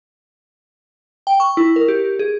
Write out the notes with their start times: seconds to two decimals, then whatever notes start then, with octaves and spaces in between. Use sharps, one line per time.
1.27 G5
1.40 C#6
1.57 E4
1.76 A#4
1.88 G4
2.19 G#4